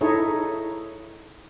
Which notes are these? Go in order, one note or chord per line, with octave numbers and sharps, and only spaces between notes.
D#4 E4 G#4 A4 C#5